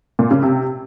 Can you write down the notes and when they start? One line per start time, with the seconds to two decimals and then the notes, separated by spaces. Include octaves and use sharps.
0.19 A#2
0.31 C#3
0.43 C3